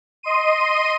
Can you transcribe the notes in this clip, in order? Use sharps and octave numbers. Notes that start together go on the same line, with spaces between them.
D#5 C6 D#7